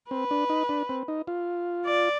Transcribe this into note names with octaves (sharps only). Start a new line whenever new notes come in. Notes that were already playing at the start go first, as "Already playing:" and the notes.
C4 B4
D4
D#4
D4
C4
D#4
F4
D5